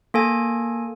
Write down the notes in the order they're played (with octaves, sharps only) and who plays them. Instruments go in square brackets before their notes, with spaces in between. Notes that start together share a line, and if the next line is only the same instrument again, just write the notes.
[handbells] A#3 A4 G#5